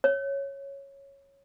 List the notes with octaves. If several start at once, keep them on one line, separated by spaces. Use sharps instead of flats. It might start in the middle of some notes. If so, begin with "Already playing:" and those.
C#5